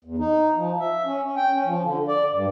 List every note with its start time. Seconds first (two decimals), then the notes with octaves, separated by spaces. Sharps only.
0.05 E2
0.19 D#4
0.56 F3
0.80 E5
1.05 C#4
1.24 C#4
1.36 G5
1.52 C#4
1.65 F3
1.83 D3
2.08 D5
2.33 G2